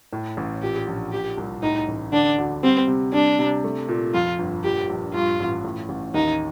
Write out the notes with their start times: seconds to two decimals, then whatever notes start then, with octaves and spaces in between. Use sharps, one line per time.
0.13 A2
0.37 A1
0.62 A#2 G4
0.87 A#1
1.12 A#2 G4
1.37 C2
1.63 A2 D#4
1.88 A1
2.12 D3 D4
2.38 D2
2.63 G3 C4
2.88 C3
3.13 G3 D4
3.39 C3
3.64 A3
3.89 A#2
4.14 F2 F4
4.39 G1
4.64 A#2 G4
4.90 A#1
5.14 G2 F4
5.40 A1
5.64 A2
5.89 A1
6.14 D#2 D#4